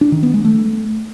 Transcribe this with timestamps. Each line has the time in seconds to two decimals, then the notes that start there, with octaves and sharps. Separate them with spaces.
0.01 D4
0.12 D#3
0.23 B3
0.34 G#3
0.45 A3